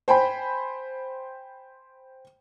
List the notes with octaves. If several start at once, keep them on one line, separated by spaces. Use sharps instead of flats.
C5 G5 G#5 B5